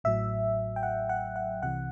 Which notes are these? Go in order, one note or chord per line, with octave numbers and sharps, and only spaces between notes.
A1 A2 F#3 E5
G5
F#5
F#5
F#5
C2 C3 E3 F#5